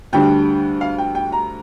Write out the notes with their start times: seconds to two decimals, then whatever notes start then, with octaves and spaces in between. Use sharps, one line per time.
0.13 D2 D3 G3 D4 G5
0.81 F5
0.98 G5
1.15 G5
1.32 A#5